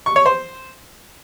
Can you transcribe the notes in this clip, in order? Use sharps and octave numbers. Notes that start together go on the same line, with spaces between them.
C#6
C#5
C5